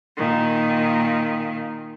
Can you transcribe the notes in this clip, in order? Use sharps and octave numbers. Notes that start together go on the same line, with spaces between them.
A#2 D#3